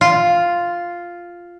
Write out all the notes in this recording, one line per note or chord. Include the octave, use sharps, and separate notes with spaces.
F4